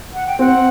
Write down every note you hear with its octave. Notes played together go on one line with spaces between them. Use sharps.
F#5
G5
C4 F#5